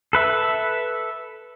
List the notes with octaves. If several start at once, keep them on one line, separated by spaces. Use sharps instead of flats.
A4 B4 E5